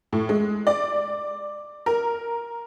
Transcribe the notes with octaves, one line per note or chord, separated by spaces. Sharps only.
A2
G#3
D5
A#4